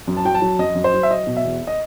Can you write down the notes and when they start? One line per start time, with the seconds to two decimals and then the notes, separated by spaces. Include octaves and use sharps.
0.07 F#2
0.17 A5
0.25 F#3 G5
0.34 A5
0.42 F#3
0.59 F#2 D#5
0.75 F#2
0.84 C5
0.94 F#3
1.03 E5
1.10 F#3 D#5
1.27 B2
1.37 E5
1.45 E2
1.67 D#5